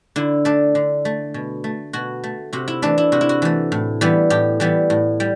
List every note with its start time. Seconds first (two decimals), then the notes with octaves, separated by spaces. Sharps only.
0.16 D3 E4
0.45 A3 D4
0.75 D3
1.05 A3
1.34 B2
1.64 A3
1.93 B2 F#4
2.24 A3
2.53 C3 F#4
2.68 E4
2.82 E3 A3 D4
2.98 E4
3.12 C3 F#4
3.21 E4
3.29 F#4
3.42 E3 A3
3.72 A2
4.01 E3 G3 B3
4.30 A2 G4
4.60 E3 G3 B3
4.90 A2
5.20 G3